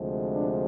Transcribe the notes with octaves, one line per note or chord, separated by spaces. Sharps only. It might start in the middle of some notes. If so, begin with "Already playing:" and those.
Already playing: D2 C3 F3 G#3
D4